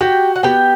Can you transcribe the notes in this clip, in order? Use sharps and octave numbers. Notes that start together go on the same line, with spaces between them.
F#4 G4 G5
F#5
B3 G4 G5